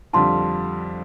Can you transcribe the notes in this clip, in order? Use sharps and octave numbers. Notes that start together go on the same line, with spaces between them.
F2 D3 G3 D4 F4 A5 C6